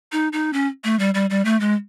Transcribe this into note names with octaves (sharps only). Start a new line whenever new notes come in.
D#4
D#4
C#4
A3
G3
G3
G3
A3
G#3